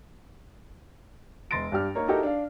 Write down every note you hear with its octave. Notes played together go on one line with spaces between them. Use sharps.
E1 C6 A6 A#6 D7
G2 D4 G4 F6
A#3 D#4 C#5 A#5
D#4 E4 F#4 G4 A4 A#4
D4 F5